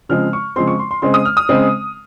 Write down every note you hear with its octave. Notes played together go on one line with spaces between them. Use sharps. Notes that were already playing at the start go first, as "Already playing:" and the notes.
C#3 F3 G#3 C4 F6
C#6
C#3 F3 G#3 C4 C6
C#6
C6
C6
C#3 G#3 C4 C6
D#6
F6
D#6
C#3 G#3 C4